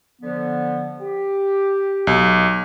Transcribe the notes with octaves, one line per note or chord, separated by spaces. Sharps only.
D3 F3 B3
G4
B1